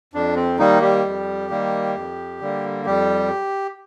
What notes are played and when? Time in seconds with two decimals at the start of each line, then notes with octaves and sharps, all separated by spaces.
0.13 F2 D4
0.36 C4
0.59 D#3 G3 A#3 D#4
0.81 G3 G4
1.05 F2
1.50 D#3 G3 A#3
1.95 F2
2.40 D3 G3 A#3
2.86 F2 G3 G4